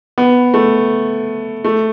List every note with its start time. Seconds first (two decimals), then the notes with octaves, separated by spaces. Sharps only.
0.18 B3
0.54 A3
1.65 A3